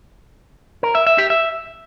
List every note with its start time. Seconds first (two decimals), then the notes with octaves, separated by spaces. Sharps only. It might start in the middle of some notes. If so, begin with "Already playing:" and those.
0.83 A#4
0.95 E5
1.07 E5
1.18 G4
1.30 E5